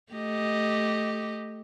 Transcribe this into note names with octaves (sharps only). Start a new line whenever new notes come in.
A3 G4 D#5